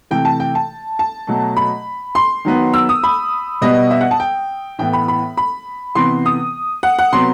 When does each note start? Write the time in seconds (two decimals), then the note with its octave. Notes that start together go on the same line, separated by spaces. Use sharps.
0.11 C3 E3 A3 G5
0.25 A5
0.40 G5
0.55 A5
0.99 A5
1.27 B2 F#3 A3
1.57 B5
2.15 C6
2.45 D#3 F#3 B3
2.74 E6
2.89 D#6
3.03 B5
3.61 B2 G3 B3 D#5
3.91 E5
4.01 F#5
4.11 A5
4.20 G5
4.79 A2 E3 B3 G5
4.93 B5
5.08 B5
5.37 B5
5.95 C3 E3 B3 C6
6.26 D#6
6.83 F#5
6.99 F#5
7.13 C3 F#3 B3 C6